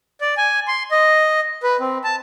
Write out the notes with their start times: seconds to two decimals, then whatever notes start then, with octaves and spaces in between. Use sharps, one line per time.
0.21 D5
0.37 G#5
0.68 C6
0.91 D#5
1.63 B4
1.80 C4
2.04 A5